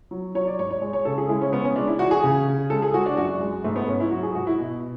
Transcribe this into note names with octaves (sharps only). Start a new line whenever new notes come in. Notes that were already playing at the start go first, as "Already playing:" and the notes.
F#3
F#3 C#5
D5
G#2 C#5
C#5
G#3
C#5
C#3 A4
G#4
G#3 E4
C#4
G#3 B3
C#4
G#3 D4
E4
E3 F#4
G#4
C#3
C#3
G#3 A4
G#4
G#3 F#4
D4
F#2 F#4
G#3
G#2 A3
B3
G#2 C#4
E4
F#3 F#4
G#4
G#2 F#4
E4
B2